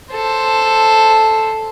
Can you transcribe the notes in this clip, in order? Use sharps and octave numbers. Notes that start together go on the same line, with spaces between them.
A4 C5